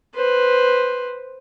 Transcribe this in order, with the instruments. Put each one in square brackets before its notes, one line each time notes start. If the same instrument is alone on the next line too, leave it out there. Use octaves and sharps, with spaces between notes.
[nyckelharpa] B4 C5